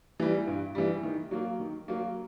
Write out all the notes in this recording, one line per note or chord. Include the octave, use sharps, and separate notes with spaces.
E3 G3
G2
E3 G3
D#3
F#3 A#3
D#3
F#3 A#3